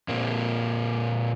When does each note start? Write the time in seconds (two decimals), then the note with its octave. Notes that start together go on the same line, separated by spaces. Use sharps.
0.08 A#2 A#3 C4